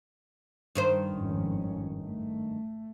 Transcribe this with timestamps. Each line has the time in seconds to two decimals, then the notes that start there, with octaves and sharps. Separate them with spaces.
0.75 G2 D#3 C5
1.13 G#1 F2 C#4
2.03 A3